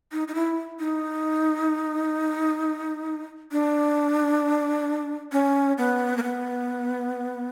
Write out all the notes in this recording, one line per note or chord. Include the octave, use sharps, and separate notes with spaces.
D#4
D#4
E4
D#4
D4
C#4
B3
A#3
B3